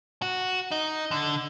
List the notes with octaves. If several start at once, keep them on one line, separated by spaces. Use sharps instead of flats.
F#4
D#4
D3